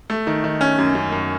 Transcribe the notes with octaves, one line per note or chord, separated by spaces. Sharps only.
A3
D#3
D#3
C#4
F#2
F#2
F#2